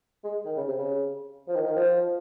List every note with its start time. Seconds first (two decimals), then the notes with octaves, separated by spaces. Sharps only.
0.24 G#3
0.46 D#3
0.57 C#3
0.67 C3
0.78 C#3
1.48 F3
1.55 D#3
1.65 D#3
1.76 F3